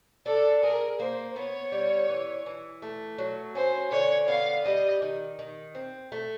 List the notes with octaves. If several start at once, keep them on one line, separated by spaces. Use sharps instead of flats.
D4 A4
G#4 A#4
A#3 C5
B3 C#5
G3
E3
E3
A3
F#3
C#4 C5
D3 C#5
B3 F5
G3 D#5
D#3
D#3
C4
A3